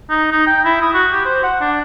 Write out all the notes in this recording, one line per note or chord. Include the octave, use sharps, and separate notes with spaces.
D#4
D#4
G5
E4
D#6
F#4
G4
C5
F#5
D4